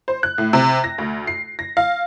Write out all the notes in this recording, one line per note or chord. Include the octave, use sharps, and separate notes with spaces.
C5
F#6
A2
C3
A#6
D2
C7
A#6
F5